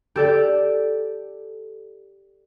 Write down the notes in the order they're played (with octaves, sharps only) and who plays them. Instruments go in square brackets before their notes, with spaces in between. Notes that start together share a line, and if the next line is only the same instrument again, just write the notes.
[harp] G4 A4 D5 G6